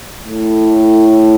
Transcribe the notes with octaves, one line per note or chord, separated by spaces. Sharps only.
A2